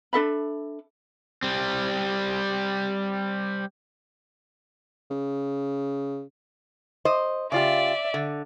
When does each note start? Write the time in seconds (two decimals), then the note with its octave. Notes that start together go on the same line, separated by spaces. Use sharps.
0.13 D4 A4 E5 B5
1.43 G3 C4
5.11 C#3
7.05 C5 D#5
7.52 C#3 F4 G4 D5 E5
8.14 D3